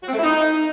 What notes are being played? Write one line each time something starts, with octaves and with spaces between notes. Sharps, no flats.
F#4
C4
A3
E4
D#4